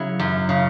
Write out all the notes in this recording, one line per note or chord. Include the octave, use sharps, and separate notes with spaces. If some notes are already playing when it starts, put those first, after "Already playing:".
Already playing: C#3 F#3 E4
F#2
C#3